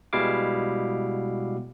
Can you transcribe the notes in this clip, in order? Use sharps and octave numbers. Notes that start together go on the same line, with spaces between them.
B2 G3 G#3 E4 F5 D6